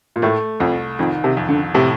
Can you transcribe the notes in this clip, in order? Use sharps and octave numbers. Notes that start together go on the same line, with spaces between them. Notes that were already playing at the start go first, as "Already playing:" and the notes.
A#2
A2 A3
C2 F2
F2 D#3
C3
F2
D3
A2 C3